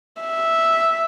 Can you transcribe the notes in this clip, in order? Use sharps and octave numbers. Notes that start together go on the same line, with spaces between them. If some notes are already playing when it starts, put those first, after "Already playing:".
E5